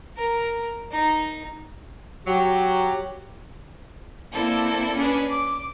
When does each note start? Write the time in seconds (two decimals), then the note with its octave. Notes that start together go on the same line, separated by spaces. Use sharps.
0.17 A#4
0.91 D#4
2.26 F#3 G4
4.32 A#3 C4 E4 A4 D5
4.96 C#4 D4 G#4 B4
5.30 D6